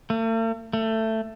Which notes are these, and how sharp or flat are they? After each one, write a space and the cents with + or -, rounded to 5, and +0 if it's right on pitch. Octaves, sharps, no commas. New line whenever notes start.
A3 +45
A3 +15